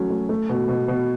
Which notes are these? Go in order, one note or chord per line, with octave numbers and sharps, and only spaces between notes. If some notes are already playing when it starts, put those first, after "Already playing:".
Already playing: F#3 A3 C#4
A3
A3
B2
B2
B2